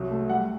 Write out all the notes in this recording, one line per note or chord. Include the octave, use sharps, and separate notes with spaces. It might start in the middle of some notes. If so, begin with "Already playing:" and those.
Already playing: C2 F#3
A3
G3 F#5